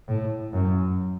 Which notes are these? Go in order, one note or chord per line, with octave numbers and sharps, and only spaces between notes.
A2
F#2